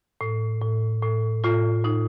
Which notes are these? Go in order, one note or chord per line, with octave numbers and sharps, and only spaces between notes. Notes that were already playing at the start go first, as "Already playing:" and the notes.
A2
A2
A2
A2 F4
A2 D#4